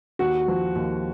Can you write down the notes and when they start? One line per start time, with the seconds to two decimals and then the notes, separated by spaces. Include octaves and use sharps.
0.19 D#2 F#4
0.48 F3
0.75 D#2